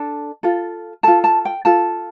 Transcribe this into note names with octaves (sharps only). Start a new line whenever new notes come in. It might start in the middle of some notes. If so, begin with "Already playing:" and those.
Already playing: D4 A4
F4 A4
F4 A4 A5
A5
G5
F4 A4 A5